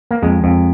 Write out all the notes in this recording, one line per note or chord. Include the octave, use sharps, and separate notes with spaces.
A#3
F2 G#3
F2